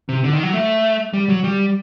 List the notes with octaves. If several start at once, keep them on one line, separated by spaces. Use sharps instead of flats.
C3
D3
D#3
F#3
A3
G3
F#3
G3